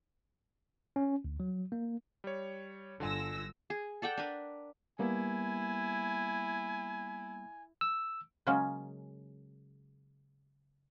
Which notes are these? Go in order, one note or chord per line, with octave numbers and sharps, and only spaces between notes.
C#4
D2
F#3
A#3
G3 C#5
G1 D3 F4 G#5 E6 A#6
G#4
A4 D5 F#5 G5
D4 A#4 B4
G3 A#3 B3 E4 G#5
E6
C#3 F#3 G#3 A#3 C#4 G#4